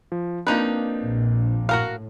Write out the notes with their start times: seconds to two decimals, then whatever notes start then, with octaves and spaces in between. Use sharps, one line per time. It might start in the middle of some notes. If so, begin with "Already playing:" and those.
0.12 F3
0.47 F3 A#3 C4 D4 D#4 B4
1.03 A#1
1.69 A2 F#4 A#4 F5